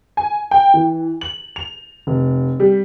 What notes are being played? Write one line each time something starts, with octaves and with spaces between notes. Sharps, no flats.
G#5
G5
E3
F#7
F7
F1
G3